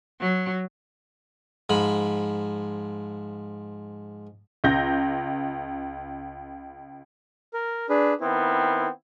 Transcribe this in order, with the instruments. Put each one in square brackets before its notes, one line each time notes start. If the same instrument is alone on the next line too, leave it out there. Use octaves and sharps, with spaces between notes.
[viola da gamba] F#3
[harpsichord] G#2 F3 B5
[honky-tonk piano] C#2 G6 A#6
[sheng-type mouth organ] A#4
D4 G#4 B4
[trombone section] D#3 B3 C4 [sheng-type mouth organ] E4